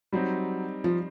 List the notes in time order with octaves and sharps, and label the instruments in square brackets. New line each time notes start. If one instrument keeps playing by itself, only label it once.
[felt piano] F#3 [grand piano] G3 C4 D#4
[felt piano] F3